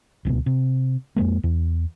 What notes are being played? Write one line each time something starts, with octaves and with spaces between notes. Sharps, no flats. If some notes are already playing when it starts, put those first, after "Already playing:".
D1 C#2 B2
C3
F2 G#2 G#3 A#3
E2